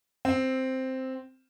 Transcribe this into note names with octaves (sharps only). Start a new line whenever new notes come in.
C4